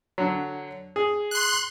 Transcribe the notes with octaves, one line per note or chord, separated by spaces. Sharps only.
D3 F#3
G#4
C6 F#6